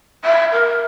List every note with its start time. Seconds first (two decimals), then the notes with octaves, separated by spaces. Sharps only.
0.24 E5
0.52 A#4